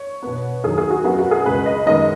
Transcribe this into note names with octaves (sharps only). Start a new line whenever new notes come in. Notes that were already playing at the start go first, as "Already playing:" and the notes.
Already playing: C#5
B2 B3
D#2 D#3 F#3 G#4
G#4
F#4
F#2 F#3 B3 F#4
F#4
G#4
C#2 C#3 G#3 B4
D#5
F#2 D#3 G#3 B3 D#5